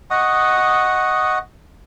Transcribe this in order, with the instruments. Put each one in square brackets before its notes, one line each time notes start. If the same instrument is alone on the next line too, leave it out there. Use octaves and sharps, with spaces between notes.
[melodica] D#5 F#5 C#6 D#6